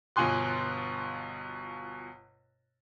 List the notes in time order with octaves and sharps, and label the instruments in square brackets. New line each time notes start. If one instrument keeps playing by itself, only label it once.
[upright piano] G1 B2 F4 G#5 C6 F#6